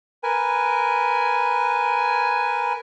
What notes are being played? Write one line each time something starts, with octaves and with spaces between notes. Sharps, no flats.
A#4 B4 G#5